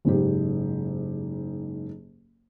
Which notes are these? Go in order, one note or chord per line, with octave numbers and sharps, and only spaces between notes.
F#1 G#2 G4